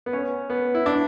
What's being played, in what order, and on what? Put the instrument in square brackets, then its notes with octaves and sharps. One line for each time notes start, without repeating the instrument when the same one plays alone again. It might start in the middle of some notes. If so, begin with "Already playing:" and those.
[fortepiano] B3
C#4
B3
E4
D4